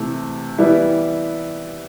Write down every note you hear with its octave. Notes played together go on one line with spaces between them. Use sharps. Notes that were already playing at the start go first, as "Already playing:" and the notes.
Already playing: C3 E3 A3
E3 G3 B3 E4